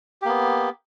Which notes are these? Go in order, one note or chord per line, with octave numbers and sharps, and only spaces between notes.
A#3 B3 G4